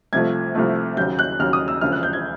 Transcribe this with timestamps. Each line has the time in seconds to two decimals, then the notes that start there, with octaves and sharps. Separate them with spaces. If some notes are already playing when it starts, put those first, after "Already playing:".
0.13 C2 C3 F3 A3 G#6
0.55 C2 C3 F3 A3
0.97 D#2 C#3 F#3 G6
1.19 F#6
1.39 D#2 C#3 F#3 F6
1.53 D#6
1.68 E6
1.81 E1 D2 C#3 F3 F6
1.92 F#6
2.03 G6
2.13 G#6